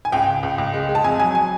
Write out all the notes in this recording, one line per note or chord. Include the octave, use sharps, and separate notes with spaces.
G#5
C#2 G5
C#2
C#2
C#2
G#3
G#3
A5
F2 G#5
F#3 G#5
G#5